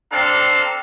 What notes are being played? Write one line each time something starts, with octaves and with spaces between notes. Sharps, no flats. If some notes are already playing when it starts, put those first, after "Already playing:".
C4 D4 A4 F5 A#5